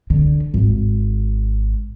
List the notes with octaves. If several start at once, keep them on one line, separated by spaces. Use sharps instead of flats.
D3
G#1